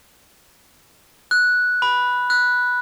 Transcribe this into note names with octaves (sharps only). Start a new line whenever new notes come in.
F#6
B5
F#6